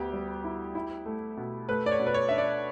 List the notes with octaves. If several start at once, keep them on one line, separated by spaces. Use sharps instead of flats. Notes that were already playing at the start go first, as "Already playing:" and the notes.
Already playing: D2 B3 G4
G3
E4
E4
A3
B2
A3 B4
D5
C#5
B2
B4
C#5
D4 E5
D5